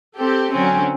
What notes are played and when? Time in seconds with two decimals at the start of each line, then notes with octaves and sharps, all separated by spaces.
0.17 C4 G4 A4
0.53 D3 F#3 C4 C#4